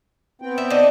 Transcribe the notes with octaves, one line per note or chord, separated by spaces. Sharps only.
B3 C4 G5
E5
D4 D#4